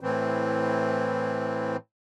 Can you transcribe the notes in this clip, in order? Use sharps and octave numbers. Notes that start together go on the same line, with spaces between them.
A2 E3 C4